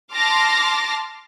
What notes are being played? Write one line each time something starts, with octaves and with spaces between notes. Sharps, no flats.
A5 C6 D6 F6 A#6